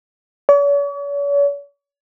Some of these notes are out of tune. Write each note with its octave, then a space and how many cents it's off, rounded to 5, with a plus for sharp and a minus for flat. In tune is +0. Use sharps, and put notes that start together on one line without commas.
C#5 +45